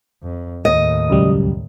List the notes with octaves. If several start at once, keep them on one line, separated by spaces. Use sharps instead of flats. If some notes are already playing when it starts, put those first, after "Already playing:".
F2
D#2 A2 D#5
C#2 F#2 G3